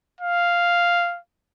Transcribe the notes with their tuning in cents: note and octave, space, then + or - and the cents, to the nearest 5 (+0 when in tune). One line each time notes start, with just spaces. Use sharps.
F5 -5